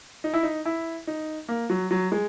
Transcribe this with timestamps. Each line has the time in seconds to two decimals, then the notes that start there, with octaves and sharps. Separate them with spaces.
0.24 D#4
0.33 E4
0.43 D#4
0.65 E4
1.07 D#4
1.49 A#3
1.70 F#3
1.91 F#3
2.12 G#3